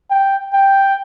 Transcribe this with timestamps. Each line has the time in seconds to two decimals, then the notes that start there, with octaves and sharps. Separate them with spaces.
0.10 G5
0.54 G5